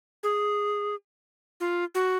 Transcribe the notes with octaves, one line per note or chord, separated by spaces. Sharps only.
G#4
F4
F#4